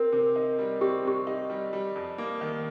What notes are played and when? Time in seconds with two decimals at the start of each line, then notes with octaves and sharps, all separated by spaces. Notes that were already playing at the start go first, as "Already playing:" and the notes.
Already playing: C4 A#4
0.12 C3
0.36 D#4
0.59 G3
0.81 C4 G4
1.04 C3 G4
1.27 D#4
1.50 G3
1.73 G3
1.96 F2
2.18 A#3
2.41 D#3